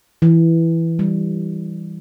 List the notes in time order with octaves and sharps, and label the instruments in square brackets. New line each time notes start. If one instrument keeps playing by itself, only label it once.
[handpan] E3
G3